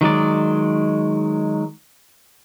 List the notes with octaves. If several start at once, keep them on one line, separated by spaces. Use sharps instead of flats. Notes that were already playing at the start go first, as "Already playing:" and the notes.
D#3 F#3 G#3 D5